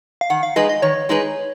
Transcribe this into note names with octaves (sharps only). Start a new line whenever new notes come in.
F5
D#3 F#5
F5
G#3 D#4 G#4 B4 D#5
D#5
D#3 C#5
G#3 D#4 G#4 B4